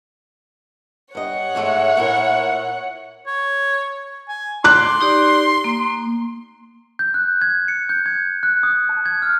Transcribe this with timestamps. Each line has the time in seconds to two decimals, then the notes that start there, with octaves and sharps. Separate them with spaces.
1.15 G2 C#5 D#5 F#5
1.55 G#2 G#3 A3
1.97 A#2 E4 A#4
3.27 C#5
4.29 G#5
4.64 C6 D6 F#6
5.01 D#4 G4 D5
5.64 A#3
6.99 G6
7.14 F#6
7.42 G#6
7.68 C#7
7.89 G6
8.06 G#6
8.43 F#6
8.63 D#6
8.89 A5
9.06 G#6
9.22 F6